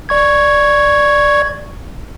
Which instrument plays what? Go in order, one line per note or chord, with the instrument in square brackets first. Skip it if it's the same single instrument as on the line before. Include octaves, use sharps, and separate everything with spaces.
[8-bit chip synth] D5 C#6 G#6